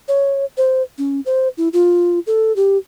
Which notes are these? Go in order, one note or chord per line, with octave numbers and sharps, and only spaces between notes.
C#5
C5
C#4
C5
E4
F4
A4
G4